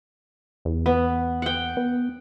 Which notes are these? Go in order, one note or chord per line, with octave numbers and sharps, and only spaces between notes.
E2
B3
F#5 G5
B3